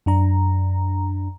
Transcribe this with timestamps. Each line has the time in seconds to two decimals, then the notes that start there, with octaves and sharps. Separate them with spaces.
0.06 F#2 D4 A#5